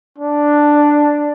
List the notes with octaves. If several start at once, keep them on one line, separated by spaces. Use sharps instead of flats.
D4